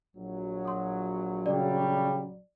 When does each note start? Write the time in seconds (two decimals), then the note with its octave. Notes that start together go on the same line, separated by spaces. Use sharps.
0.16 A#1 F#3
0.65 C6 D#6
1.46 C#3 G3 D5